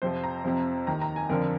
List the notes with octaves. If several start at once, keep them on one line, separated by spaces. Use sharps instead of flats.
F2 C3 F3 C5
A#5
F2 C3 F3
D#2 D#3 A#5
A#5
G#5
F2 D3 F3 A#4